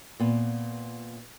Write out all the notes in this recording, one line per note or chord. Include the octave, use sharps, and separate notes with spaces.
A#2 B3